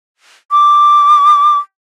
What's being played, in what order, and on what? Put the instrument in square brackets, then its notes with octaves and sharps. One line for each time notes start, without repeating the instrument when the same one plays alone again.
[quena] D6